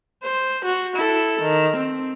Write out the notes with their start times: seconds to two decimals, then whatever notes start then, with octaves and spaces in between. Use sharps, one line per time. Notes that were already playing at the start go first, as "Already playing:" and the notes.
0.24 C5
0.65 F#4
0.96 E4 A4
1.42 D#3
1.77 C4